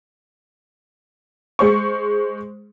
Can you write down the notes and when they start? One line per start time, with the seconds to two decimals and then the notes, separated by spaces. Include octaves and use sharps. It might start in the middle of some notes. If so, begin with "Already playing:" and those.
1.59 G#3 C5 C#6